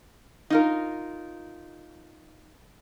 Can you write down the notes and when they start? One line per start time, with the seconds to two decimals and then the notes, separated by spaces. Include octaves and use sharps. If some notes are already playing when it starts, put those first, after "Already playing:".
0.50 D#4 F4 A#4